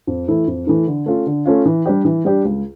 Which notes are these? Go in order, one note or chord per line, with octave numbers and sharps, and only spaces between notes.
F2
E3 A3 E4
F2
E3 A3 E4
D3
A3 C#4 F4
D3
A3 C#4 F4
E3
G3 D4 G4
E3
G3 D4 G4
C#2